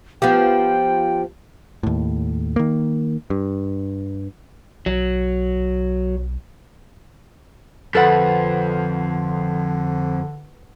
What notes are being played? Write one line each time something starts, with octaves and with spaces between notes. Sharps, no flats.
F3 B3 G4 G5
D#2 A2
D#3 A#3
G2
B1 F#3
F2 D3 A4 B4 F#5